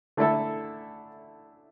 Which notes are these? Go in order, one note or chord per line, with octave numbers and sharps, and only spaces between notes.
D3 A3 E4 A4